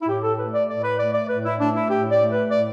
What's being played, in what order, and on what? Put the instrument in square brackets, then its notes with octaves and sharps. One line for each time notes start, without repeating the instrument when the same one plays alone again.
[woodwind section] E4
A2 G4
A4
A3 B4
D5
A2 D5
B4
A3 D5
D5
A2 B4
E4
A3 D4
E4
A2 G4
D5
A3
B4
A2 D5